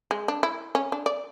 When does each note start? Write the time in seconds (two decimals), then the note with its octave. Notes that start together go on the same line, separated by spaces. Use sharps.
0.11 G#3
0.28 D4
0.43 E4
0.75 C#4
0.92 D4
1.06 D5